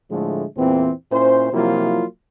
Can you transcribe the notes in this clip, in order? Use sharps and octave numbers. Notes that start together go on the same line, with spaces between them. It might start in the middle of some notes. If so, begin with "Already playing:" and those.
A2 D3 F3 G#3 A3
E2 A#2 E3 C4
A#2 C#4 E4 C5
C3 F3 F#3 A#3 E4 F4